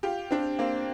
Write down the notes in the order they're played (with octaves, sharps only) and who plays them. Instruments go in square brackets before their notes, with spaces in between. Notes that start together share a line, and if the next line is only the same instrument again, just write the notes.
[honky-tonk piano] F4 G4
C4 D4
A#3 C4